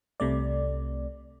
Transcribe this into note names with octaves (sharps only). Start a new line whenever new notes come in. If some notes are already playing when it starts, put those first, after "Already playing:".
C2 C3 A3 D5